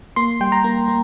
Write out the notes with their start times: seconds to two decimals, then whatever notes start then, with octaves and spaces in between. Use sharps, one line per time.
0.16 A#3 C6
0.41 G3 G5
0.52 A#5
0.64 A#3
0.88 A#3